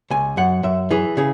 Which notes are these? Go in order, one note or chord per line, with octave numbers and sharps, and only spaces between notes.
C#2 G#5
F#2 F#5
F#2 E5
E3 G#4
C#3 G#4